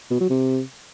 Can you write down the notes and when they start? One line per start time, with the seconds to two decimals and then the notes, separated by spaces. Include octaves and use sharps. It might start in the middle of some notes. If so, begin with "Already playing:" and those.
0.11 B2
0.20 F#3
0.30 C3